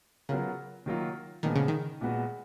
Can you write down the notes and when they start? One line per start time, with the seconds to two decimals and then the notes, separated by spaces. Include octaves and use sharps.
0.29 C#3 F#3 B3 F4 A#4
0.86 D#3 F#3 A#3 F4
1.43 A#2 D#3 F3 G#3 B3
1.56 C#3
1.68 D#3
2.01 A#2 G#3 B3 F#4